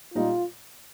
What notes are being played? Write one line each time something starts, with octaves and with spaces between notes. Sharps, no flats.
A#2 G3 D#4 F4